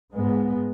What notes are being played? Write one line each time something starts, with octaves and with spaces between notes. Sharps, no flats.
G#2 G#3 B3